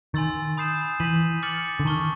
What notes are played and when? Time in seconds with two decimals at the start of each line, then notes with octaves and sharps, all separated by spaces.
0.14 D#3 G#5 C6 E6 A6
0.57 B5 D#6 G6 C7 E7
1.00 E3 G6 B6 D#7 F#7
1.43 D6 F6 A6 C#7 F#7
1.80 D3
1.85 D#3 A5 C#6 F6